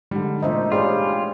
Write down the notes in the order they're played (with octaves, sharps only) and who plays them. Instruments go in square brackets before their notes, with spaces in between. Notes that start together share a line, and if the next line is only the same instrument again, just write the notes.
[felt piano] D3 G3 [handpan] G#3 D#4
[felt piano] A1 A#2 [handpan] D4 C5 E5 [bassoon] D#4
[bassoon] G3 [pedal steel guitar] F4 [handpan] G#4 C5 C#5